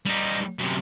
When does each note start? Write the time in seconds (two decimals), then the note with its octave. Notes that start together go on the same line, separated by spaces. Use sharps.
0.06 G3 D#4
0.59 F#2 C3